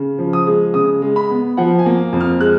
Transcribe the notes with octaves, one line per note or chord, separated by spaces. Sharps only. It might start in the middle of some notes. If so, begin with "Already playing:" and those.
Already playing: C#3
F3
D#6
G#3
C#3 D#6
G#3
B5
B3
F3 F#5
G#5
A#3
F2
F6
G#3 F#6